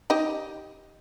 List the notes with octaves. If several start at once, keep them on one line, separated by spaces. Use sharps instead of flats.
D#4 G4 D#5